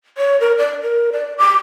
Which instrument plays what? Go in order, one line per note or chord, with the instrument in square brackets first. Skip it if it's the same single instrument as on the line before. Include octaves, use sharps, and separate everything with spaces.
[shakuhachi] C#5
A#4
D5
A#4
D5
D6